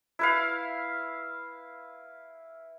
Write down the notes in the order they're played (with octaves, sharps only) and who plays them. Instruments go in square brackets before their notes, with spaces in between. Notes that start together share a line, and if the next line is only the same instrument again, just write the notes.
[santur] E4 B4 F5